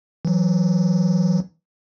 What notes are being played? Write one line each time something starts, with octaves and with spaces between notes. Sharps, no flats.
E3 F#3